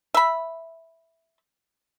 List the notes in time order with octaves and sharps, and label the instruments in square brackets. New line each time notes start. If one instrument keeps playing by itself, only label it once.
[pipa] E5 B5